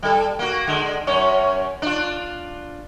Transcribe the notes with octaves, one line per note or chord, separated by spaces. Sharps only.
G3 A4
A#3 F#4
D3 G#3
F#2 C#4 C#5
D4 F4